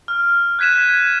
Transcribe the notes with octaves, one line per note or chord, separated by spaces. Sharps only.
F6
F#6 G#6 B6 D#7 E7
G#6